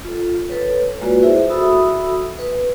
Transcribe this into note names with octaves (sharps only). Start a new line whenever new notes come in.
F4 A4
A4 B4 C#5
G#3 A#3 F4 F#4 B4 D5
E4 G#4 C5 E5
F#4 A4 E5 B5 D#6 E6
B4